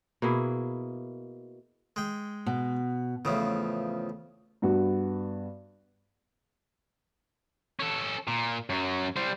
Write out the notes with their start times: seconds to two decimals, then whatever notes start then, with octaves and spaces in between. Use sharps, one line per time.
0.22 B2 A#3 E4 G#4
1.96 G#3 G5
2.46 B2
3.25 A1 E2 C#3 F3
4.62 G2 B3 F#4
7.79 C#4 A4
8.28 A#2
8.70 F#2 F#3
9.16 G3 C5